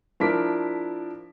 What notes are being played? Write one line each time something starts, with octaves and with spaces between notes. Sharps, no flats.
F3 D4 E4 A#4 D6 B6